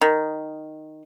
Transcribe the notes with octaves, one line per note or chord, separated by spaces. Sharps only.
D#3